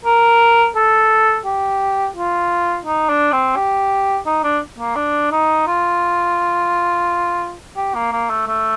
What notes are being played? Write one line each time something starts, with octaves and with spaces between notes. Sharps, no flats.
A#4
A4
G4
F4
D#4
D4
C4
G4
D#4
D4
A#3
D4
D#4
F4
G4
A#3
A#3
A3
A3